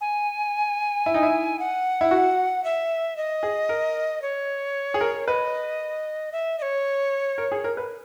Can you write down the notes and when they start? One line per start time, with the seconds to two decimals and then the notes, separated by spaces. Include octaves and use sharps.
0.01 G#5
1.06 E4
1.14 D#4
1.23 E4
1.59 F#5
2.01 E4
2.11 F#4
2.64 E5
3.17 D#5
3.43 G#4
3.69 A#4
4.22 C#5
4.94 G#4
5.01 A#4
5.27 B4 D#5
6.32 E5
6.59 D#5
6.62 C#5
7.38 A#4
7.52 G#4
7.64 A#4
7.77 B4